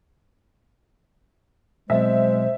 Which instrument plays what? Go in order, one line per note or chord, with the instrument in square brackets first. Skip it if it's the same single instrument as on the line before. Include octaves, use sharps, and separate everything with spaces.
[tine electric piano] B2 F#3 C4 [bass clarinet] G#3 [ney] C5 [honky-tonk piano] E5